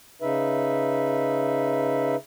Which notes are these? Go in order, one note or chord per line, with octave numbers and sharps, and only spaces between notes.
C#3 D#4 B4 E5